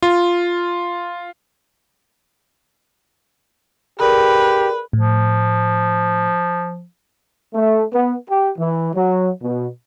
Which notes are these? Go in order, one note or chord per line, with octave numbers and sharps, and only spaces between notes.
F4
G4 G#4 A#4 B4 D5
A2 F3
A3
B3
G4
E3
F#3
B2